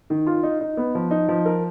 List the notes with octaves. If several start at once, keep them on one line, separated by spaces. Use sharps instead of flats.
D#3
F4
D#4
D#4
B3
F3
D#4
F3
A#4